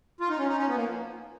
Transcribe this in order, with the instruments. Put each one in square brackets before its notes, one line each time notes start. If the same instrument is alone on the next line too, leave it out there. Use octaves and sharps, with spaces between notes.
[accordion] F4
D#4
C#4
D#4
C#4
B3
A#3
F3